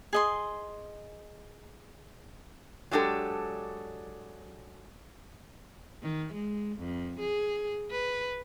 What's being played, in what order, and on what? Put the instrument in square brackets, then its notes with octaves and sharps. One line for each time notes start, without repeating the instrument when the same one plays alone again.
[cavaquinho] G#4 D#5 C6
[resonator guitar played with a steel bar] F#3 G#3 D4 G4 A4
[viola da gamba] D#3
G#3
F2
G#4
B4